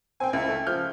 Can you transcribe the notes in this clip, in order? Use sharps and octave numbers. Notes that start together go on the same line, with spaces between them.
C4 G5 G#5
C#2 E4 E5
A3
F3 F6 G6